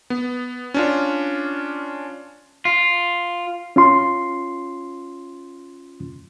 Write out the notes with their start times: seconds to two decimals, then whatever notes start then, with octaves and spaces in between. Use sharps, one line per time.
0.10 B3
0.74 C#4 D4 F4
2.65 F4
3.76 C#4 F4 C6